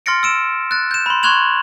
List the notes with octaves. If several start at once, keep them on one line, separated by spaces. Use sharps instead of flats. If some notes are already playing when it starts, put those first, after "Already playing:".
C6 F6 A6 A#6 C#7 D7
E6 D7 E7
F#6 A6
G6 E7
B5 C6
C6 C#6 F#6 G#6 F7 F#7